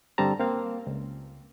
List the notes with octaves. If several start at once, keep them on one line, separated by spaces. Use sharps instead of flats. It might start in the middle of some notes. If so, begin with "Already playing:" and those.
G2 D3 G3 C4 A5 A#5
A#3 C4 F5
C#2